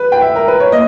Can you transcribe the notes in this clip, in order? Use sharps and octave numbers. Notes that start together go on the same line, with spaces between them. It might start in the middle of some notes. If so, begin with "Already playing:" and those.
Already playing: B4
G5
E5
A#4
B4
C#5
A#3 D#5